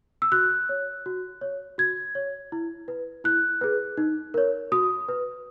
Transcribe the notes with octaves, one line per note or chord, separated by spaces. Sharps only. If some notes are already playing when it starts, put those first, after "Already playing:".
E6
F#4 F#6
C#5
F#4
C#5
F#4 G#6
C#5
E4
B4
E4 F#6
G#4 B4
D#4
A#4 C#5
F#4 D#6
B4